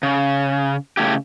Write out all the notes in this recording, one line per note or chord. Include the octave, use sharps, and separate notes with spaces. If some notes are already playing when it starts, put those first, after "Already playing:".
C#3
C#3 A3 E4 G4